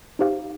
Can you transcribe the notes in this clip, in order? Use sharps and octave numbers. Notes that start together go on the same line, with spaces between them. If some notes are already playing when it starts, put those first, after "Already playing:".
D#4 G4 C5 F5